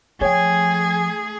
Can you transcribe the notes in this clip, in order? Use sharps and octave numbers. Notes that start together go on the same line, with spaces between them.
F3 A3 G#4 C#5 G5 G#5